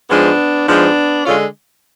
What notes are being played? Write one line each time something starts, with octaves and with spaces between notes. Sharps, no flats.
G#2 F3 G#3 B3 D4
G#2 F3 G#3 B3 D4
D3 G#3 C#4 F4